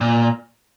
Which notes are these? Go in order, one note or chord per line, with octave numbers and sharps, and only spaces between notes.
A#2